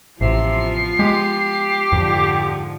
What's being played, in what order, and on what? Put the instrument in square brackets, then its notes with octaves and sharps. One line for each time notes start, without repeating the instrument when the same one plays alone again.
[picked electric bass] A1 [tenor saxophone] C3 [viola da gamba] F3 B3 F4 [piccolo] C7
[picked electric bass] G#3 [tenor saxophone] G4
[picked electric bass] F2 [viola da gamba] G#2 D3 F3